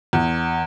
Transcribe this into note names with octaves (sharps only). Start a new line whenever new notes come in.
E2